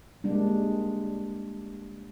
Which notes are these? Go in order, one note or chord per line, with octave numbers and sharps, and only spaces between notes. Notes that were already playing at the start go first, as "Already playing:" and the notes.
G3 G#3 A#3 D4